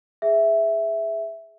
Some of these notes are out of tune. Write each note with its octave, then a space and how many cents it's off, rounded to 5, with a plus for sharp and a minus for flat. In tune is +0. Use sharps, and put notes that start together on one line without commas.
G#4 +0 E5 +0